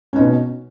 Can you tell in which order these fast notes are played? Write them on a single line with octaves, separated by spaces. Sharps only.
C#4 D#4 B2